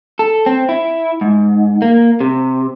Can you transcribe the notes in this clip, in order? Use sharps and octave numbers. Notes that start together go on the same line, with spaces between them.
A4
C4
E4
G#2
A#3
C3